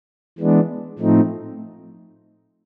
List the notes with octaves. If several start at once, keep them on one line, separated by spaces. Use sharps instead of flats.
E3 G#3 B3 D4
A2 F3 A3 C4 D#4